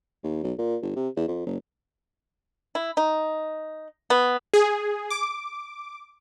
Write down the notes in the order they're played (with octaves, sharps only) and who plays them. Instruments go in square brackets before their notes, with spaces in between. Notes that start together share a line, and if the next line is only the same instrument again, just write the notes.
[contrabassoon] D#2
B1
A#2
G1
C3
E2
F2
F#1
[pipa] E4
D#4
B3
[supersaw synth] G#4
D6